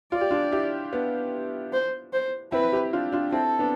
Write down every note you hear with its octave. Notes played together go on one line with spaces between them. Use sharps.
F4 D5
G4
D4 F4
E4 G4
B3 D4
C5
C5
C4 E4 B4
E4 G4
D4 F4
D4 F4
C4 E4 A4
B3 D4